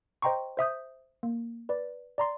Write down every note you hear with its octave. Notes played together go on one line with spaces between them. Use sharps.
C5 D#5 G5 A#5 C6 C#6
C5 E5 D#6 G6
A#3
B4 D5
D5 A#5 C6